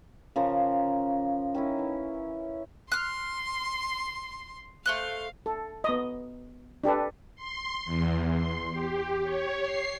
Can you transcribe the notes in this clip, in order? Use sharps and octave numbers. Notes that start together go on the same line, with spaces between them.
C#3 F3 A#4 A#5
D#3 C#4 D#4 E4
E3
C6 F6 F#6
A3 C5 F5 F#6
A4
B3 D#5
D4 G4 A4 B4
C6
E2
C6
G4
C#5
C7